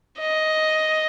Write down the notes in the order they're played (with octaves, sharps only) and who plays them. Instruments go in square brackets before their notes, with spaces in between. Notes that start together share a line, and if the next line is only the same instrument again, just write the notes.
[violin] D#5